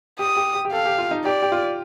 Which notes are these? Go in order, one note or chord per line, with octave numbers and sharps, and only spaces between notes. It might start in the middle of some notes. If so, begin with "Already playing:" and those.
G4 D#6
G4
G4
G4
A4 F5
G4
F4
D#4
G4 D5
G4
F4